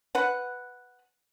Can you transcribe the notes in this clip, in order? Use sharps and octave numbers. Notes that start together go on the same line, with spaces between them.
B4 F#5